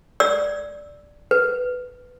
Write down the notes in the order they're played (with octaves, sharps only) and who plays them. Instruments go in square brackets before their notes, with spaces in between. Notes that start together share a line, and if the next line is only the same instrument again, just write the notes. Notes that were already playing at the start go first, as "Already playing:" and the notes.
[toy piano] D5 E6
B4